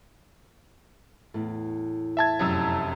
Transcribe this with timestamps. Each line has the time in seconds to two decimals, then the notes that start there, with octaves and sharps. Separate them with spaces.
1.34 E2 A2
2.17 E5 A5 G#6
2.39 F1 F#2 E6